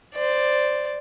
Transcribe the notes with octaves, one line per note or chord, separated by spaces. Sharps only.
C5 D5